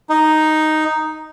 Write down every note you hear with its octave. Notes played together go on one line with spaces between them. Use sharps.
D#4